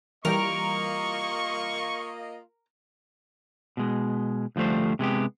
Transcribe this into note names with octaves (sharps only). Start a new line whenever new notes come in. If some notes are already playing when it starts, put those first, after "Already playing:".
E3 G3 A#3 F4 G4 A#4 D#5 C#6
B2 G#3
D2 F3 G3 A3 C5
C3 G#3 B3 G4